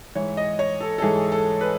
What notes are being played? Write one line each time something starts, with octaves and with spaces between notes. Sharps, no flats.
G#2 E3 C#5
D#5
C#5
A4
A4
G#2 E3 G#4
A4
B4